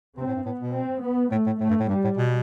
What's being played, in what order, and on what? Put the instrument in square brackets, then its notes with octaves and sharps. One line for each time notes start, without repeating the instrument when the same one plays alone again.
[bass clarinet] C3 [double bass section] C4
[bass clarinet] A2
G2
[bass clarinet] A2 [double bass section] B3
[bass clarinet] B2
[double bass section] C4
B3
[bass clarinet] A2 [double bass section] A3
[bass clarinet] A2
[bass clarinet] A2 [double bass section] A3
[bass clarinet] G2
A2
[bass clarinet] G2 [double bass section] G3
[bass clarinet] A2
B2